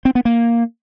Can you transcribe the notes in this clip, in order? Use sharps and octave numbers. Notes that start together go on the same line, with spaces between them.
C4
B3
A#3